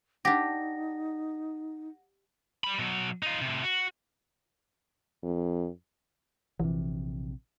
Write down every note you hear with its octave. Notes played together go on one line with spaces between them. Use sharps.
D4 D#4 G4 F#5 A#6
G3 B5
B2 F#3
D#4 F4
A2 C3
F#4
F2
A#1 C3 E3